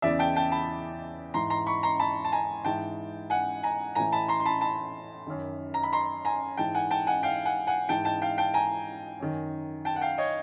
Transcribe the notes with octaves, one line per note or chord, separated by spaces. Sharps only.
E2 C#3 E3 D5 E5
G5 A5
G5 A5
A5 B5
G#2 E3 A#5 C6
A#5 C6
B5 C#6
A#5 C6
A5 B5
A5
G#5 A#5
G#2 E3 G5 A5
F#5 G#5
G#5 A#5
A2 E3 G#5 A#5
A5 B5
A#5 C6
C6
A5 B5
A5 B5
F#2 D#3
A#5
B5
A#5 C6
G#5 A#5
G#2 E3 G5 A5
F#5 G#5
G5 A5
F#5 G#5
F5 G5
F#5 G#5
F#5 G#5
G#2 E3 G5 A5
G5 A5
F5 G5
G5 A5
G#5 A#5
F#2 D#3
G5 A5
F#5
F5 G5
C#5 D#5